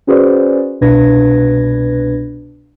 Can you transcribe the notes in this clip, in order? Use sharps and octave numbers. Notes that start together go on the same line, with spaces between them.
C#4 F#4 G#4 B4 C5 D5
C2 B2 D4 B4 G#6 A#6